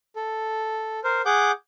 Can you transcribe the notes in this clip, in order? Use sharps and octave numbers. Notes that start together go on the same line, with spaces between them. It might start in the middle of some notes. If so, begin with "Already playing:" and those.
A4
A#4 C5
G#4 F#5 D6 G6